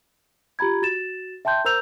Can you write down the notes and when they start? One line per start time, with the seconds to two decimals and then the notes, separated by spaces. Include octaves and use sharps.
0.59 F4 G4 A#5 B5 G#6
0.82 F#4 A6 E7
1.45 E5 G5 A5 C6 G6
1.65 A#4 C5 A#5 E6 G6 F7